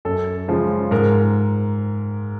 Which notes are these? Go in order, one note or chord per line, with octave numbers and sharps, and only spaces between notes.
F#2 A4
C#3 F3 G#3
G#2 A#4